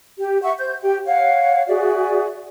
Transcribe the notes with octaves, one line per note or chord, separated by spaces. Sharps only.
G4
E5 F#5 C#6
C5 G6
G4 G5
C#5 F5 F#5
F#4 G#4 D5 E5